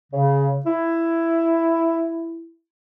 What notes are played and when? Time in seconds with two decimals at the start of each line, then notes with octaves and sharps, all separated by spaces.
0.13 C#3
0.66 E4